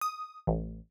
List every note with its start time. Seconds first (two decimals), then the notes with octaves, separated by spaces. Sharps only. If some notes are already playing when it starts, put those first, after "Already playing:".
0.01 D#6
0.47 A1